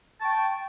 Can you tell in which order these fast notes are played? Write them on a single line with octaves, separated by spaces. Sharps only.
A5 C#6 G5